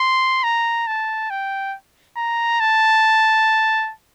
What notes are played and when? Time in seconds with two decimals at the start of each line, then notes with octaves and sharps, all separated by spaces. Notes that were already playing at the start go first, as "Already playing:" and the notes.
Already playing: C6
0.44 A#5
0.87 A5
1.30 G5
2.17 A#5
2.60 A5